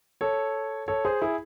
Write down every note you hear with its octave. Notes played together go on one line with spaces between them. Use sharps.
A4 C#5
A4 C#5
G#4 C5
E4 G#4